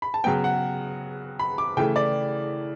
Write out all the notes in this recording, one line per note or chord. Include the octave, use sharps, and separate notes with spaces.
B5
A5
C#3 F#3 B3 G5
F#5
B5
D6
C#3 E3 A3 G5
D5